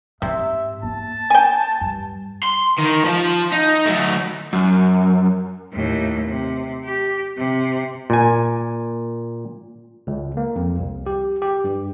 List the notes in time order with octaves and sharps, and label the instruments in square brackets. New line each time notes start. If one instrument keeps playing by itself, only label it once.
[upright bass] G#2 [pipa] C3 [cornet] E5
[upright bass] A#3 [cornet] A5
[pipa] G5 G#5
[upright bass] G2
[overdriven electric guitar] C6
D#3
F3
D#4
F#3 A3
[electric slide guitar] F#2
[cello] D#2 A2
C3
G4
C3
[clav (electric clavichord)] A#2 G#5
[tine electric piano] C#2
A#3
F2
C2
G4
G4
G2